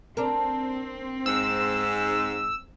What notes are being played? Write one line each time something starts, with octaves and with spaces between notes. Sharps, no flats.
C4 D4 A#4
G#2 E6